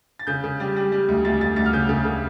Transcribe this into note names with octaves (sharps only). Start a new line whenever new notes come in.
A6
C#3 G6
C#3
G3
G3
G3
D2
D2 A6
D2 A6
D2 A6
F6
C#3 G6
C#3
C#3